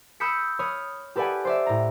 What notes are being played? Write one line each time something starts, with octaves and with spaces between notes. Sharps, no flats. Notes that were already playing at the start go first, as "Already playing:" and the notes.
B5 D#6 E6 G6 B6 C#7
C#5 B5 D#6 F6
G4 A4 B4 D5 F#5 G#5
C5 D5 E5
A2 A#5